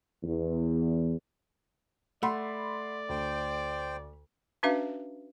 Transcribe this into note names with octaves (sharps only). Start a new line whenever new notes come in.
E2
A3 D5 F#5 B5 C6
D2 C5 G5
C#4 D4 F#4 B4 E5 F5